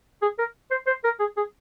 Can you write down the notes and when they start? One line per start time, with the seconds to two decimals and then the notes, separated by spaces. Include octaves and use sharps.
0.22 G#4
0.39 A#4
0.71 C5
0.87 C5
1.04 A#4
1.20 G#4
1.37 G#4